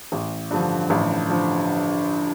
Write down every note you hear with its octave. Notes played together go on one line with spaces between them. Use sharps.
A1
G2 D3 F3
A1
D3 F3